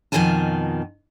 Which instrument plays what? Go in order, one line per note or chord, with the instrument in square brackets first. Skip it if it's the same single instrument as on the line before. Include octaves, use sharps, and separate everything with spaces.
[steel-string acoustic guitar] F2 B2 D#3 F4 G#5 A5